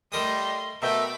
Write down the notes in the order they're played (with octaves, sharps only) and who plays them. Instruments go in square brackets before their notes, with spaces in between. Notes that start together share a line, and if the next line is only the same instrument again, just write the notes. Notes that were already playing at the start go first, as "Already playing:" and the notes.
[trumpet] G3 [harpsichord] A3 A#4 D#6 [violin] D#5 C6
[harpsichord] B2 [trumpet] A3 [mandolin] A#4 E5 G5 [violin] B5 D6